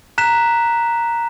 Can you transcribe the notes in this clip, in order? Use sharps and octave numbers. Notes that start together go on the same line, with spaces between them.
A#5 F#6 B6 E7